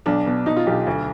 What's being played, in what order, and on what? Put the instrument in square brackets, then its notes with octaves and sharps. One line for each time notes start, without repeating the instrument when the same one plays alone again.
[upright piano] B1 D4
B2
B2 D#4
F4
B1 G4
D2